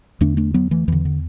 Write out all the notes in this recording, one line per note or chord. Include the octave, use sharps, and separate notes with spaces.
E2 D3 A3 D4
A3 D4
F#3 B3
E3 A3
E2 D3 E3
D3